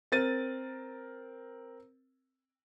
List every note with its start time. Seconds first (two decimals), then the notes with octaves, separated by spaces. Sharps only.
0.12 C4 A#4 A6 D#7